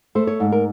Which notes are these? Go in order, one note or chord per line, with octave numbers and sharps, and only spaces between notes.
A3 C5
C#5
G#2
A#4